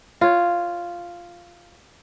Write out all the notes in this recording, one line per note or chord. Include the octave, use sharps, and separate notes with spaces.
F4 C#5